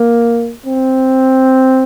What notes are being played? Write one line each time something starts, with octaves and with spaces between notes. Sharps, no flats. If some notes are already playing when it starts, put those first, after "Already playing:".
Already playing: A#3
C4